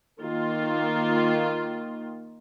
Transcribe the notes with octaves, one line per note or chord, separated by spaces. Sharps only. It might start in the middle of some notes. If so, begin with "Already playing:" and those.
D#3 A#3 F4